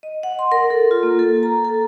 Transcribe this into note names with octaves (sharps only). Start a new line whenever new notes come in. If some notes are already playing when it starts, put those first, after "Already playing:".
D#5
F#5
C6
A#4
A4
F4
A#3
A4
A#5
A4